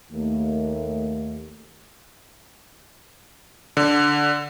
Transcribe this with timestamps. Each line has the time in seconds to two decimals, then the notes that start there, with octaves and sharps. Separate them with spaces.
0.12 D#2 A3
3.77 D3